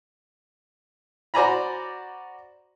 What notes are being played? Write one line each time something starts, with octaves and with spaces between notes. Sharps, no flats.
F#4 C5 D5 G#5 A#5 B5